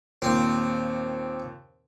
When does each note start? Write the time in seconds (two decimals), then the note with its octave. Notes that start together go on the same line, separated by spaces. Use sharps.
0.22 D#2 A#2 C4